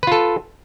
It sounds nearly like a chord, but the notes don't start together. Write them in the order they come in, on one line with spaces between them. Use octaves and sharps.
B4 F4 A4